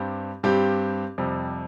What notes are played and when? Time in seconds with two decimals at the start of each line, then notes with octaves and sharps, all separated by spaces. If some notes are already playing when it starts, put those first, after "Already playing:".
Already playing: G2 G3 C4 G4
0.43 G2 G3 C4 G4
1.18 F2 C3 G3